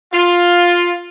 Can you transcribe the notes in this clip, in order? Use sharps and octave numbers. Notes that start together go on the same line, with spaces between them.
F4